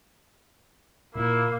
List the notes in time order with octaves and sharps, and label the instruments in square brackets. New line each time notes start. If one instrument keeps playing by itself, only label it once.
[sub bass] A#2 [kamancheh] A#3 [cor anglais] E4